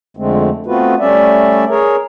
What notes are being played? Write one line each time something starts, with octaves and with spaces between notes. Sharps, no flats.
F2 D3 G#3 A3 C4
A3 B3 C4 F4 F#4 B4
G3 A3 C#4 D5 E5
G#4 A#4 C#5